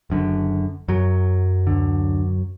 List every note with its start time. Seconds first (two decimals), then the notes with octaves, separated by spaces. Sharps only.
0.10 F#1 F#2 D3
0.88 F#2 F#3
1.67 D2 D3